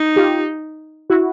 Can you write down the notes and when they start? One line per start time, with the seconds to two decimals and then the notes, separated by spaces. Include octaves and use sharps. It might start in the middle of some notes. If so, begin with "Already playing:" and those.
Already playing: D#4
0.16 F4 G4
1.10 E4 F#4